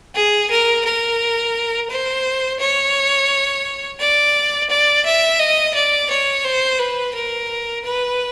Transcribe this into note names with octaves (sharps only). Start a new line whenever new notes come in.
G#4
A#4
A#4
C5
C#5
D5
D5
E5
D#5
D5
C#5
C5
B4
A#4
B4